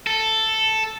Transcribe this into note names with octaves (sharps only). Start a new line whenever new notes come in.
A4